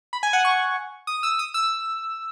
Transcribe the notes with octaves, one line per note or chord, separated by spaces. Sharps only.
B5
G#5
F#5
C#6
D#6
E6
D#6
E6